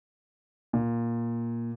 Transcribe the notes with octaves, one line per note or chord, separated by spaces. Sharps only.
A#2